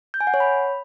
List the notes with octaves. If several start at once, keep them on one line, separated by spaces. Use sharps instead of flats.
G6
G#5
F#5
C#5
B5